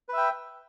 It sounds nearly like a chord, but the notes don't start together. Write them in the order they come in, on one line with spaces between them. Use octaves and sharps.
B4 E5 G5